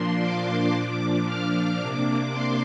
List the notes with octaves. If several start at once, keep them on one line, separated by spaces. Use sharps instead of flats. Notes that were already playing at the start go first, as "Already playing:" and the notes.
Already playing: A#2 F3 A#3 D4 C6
D6
A#2 F3 D4
F6
C3 A#3 D4 D6
C6